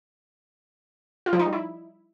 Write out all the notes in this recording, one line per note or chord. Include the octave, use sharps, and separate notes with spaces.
F4
F3
D#4
G3
E4